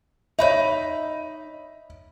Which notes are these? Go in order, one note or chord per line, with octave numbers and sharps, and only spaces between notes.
D#4 C#5 E5 B5 G6